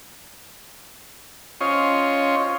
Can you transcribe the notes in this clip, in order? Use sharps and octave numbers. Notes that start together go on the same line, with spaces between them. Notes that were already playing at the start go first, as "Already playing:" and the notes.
C#4 F4 C5 C#5 D#5